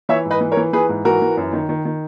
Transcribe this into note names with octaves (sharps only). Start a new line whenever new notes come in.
E3 C#5 E5
G#2
B4 D#5
E3
A#4 C#5
E3
E3 G#4 B4
G#2
E3 F#4 A#4
E3
F#2
D#3
D#3
D#3